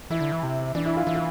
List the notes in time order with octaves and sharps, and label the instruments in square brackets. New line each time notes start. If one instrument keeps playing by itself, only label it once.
[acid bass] E3 [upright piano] E4
[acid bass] D3
E3
C3
[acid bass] E3 [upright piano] D4
[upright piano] E4
F4
[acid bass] E3 [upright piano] E4
[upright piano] F4